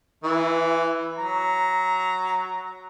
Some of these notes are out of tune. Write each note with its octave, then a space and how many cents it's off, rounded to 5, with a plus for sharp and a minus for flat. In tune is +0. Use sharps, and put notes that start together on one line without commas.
E3 +5 E4 +30
F#3 +0 A#5 +0